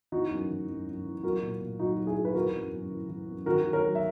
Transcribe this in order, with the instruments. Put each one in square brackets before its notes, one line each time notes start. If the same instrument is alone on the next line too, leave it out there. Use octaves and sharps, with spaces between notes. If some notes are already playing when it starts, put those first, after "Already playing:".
[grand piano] E3 D#4 F#4
F#2
E3
F#2
F#2
E3
F#3 F#4 A#4
A#2
A#2
F#3 D#4 F#4
F#3
E4 G#4
F#3
B4
E3 F#4 A#4
F#2
F#2
E3
E3
F#2
D#3 F#4 A#4
D#3
A#4 C#5
F#3
E5